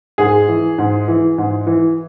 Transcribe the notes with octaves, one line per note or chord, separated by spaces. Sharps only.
G#2 G#4
E3
G#2
E3
G#2
E3